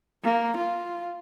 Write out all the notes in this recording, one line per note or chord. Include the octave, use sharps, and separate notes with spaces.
A#3
F4